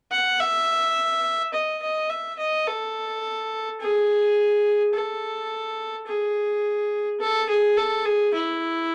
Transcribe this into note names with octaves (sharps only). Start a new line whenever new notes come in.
F#5
E5
D#5
D#5
E5
D#5
A4
G#4
A4
G#4
A4
G#4
A4
G#4
E4